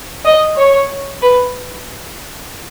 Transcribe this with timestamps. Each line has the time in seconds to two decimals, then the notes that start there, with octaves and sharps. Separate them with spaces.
0.25 D#5
0.58 C#5
1.21 B4